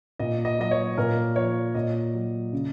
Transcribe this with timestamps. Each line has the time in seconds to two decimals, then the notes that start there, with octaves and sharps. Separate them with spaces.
0.19 A#2 D#5
0.45 D#5
0.58 F#3 D#5
0.71 C#5
0.98 A#2 A#4
1.36 F3 C#5
1.75 A#2 D#5
2.14 F#3
2.52 C#3